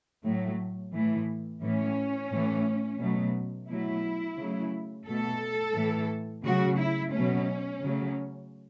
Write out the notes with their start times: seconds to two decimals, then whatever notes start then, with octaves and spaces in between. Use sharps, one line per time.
0.24 A2 F#3 A3
0.93 A2 E3 A3
1.62 A2 E3 A3 C#4
2.31 A2 E3 A3
3.00 B2 F#3 A3
3.68 B2 F#3 A3 E4
4.37 C#3 F#3 A3
5.06 B2 A3 A4
5.75 A2 E3 A3
6.44 C#3 F#3 A3 F#4
6.78 E4
7.13 B2 F#3 A3 C#4
7.82 C#3 F#3 A3